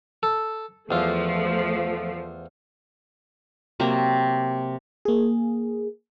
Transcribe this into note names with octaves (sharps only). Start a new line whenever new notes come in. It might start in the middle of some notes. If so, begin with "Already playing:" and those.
A4
E2 F3 A3 F4
C3 F#3 A#3
A#3 G#4